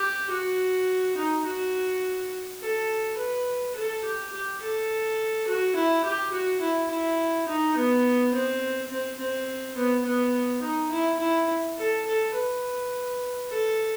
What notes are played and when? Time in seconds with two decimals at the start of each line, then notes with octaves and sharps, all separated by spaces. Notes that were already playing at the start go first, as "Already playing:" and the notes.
Already playing: G4
0.30 F#4
1.17 D#4
1.45 F#4
2.61 A4
3.18 B4
3.75 A4
4.04 G4
4.32 G4
4.61 A4
5.47 F#4
5.76 E4
6.04 G4
6.33 F#4
6.61 E4
6.90 E4
7.48 D#4
7.77 B3
8.34 C4
8.91 C4
9.19 C4
9.77 B3
10.05 B3
10.62 D#4
10.91 E4
11.20 E4
11.77 A4
12.07 A4
12.34 B4
13.50 A4